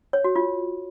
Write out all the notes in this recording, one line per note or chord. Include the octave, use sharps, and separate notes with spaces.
C#5
F#4
F4